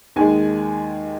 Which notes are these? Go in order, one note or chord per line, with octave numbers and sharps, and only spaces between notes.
D#2 D#3 G#3 G#5